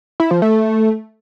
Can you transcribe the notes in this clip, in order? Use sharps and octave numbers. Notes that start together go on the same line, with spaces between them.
E4
F3
A3